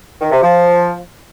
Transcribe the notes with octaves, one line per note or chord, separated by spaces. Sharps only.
D#3
C3
F3